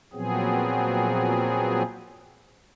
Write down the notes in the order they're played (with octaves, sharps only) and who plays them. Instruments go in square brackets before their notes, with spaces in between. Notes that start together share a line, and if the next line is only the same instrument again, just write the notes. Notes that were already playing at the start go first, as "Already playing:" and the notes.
[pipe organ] A#2 F3 F#3 B3 C4 G#4